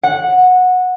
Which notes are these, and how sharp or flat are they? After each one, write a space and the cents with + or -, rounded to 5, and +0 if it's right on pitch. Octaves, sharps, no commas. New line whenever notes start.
F#5 -15